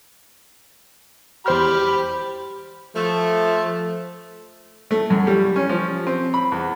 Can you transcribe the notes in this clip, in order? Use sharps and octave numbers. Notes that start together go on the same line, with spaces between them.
E2 G4 C5 B5 F6
F3 A3
A3
F#2
G3
C#4
F3
C4
B5
E2